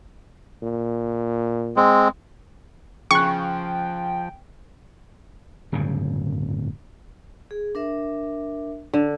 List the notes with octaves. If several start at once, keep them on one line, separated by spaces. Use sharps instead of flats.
A#2
G#3 C4
C#3 F3 G5 C#6 F#6
D1 G1 F#2 C#3
G#4
D4 A#4 E5
D3